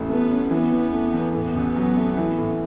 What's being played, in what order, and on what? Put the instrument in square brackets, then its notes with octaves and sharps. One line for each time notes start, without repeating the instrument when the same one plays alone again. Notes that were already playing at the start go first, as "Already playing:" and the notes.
Already playing: [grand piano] A1 A2
[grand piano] A3 [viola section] B3
[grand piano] C#4
[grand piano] E3 [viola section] B3
[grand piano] E2
A3
E2
[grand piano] A2 [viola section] B3
[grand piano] A1
F#3
A3
E3
A2